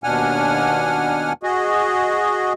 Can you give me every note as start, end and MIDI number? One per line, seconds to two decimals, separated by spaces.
0.04 1.33 39
0.04 1.33 47
0.04 1.33 62
0.04 1.33 78
0.04 1.33 80
0.04 1.33 89
1.43 2.53 66
1.43 2.53 68
1.43 2.53 75